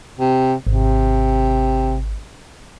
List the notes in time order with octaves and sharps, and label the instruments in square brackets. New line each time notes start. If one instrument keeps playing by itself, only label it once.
[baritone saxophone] C3
[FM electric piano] G#1 [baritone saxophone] C3